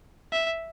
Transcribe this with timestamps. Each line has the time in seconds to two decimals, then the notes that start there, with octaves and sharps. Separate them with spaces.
0.32 E5